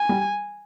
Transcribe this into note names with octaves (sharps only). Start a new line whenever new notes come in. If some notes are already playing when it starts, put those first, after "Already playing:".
Already playing: G#5
G3